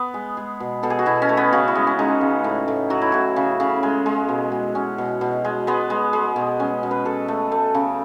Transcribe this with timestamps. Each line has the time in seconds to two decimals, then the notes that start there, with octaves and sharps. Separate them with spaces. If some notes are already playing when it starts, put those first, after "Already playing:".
Already playing: B3
0.14 G#3
0.37 G#3
0.60 B2
0.83 B2 A4
0.90 G#4
0.99 F#4
1.06 B2 E4
1.22 C#4
1.29 A3
1.37 B3
1.53 C#3 F#4
1.68 E4
1.75 G#3
1.87 C#4
1.99 G#3 D#4
2.21 C#3
2.44 A2
2.68 A2
2.90 F#3 F#4
3.02 E4
3.12 A2 F#4
3.36 C#3
3.60 C#3
3.83 G#3
4.06 G#3
4.29 B2
4.52 B2
4.75 B2 C#4
4.98 B2
5.21 B2
5.45 G#3
5.67 G#3 B3
5.90 G#3
6.13 G#3
6.36 B2
6.60 G#3 C#4
6.83 B2
6.91 B4
7.05 F#3 A4
7.28 A3
7.52 A3
7.74 C#3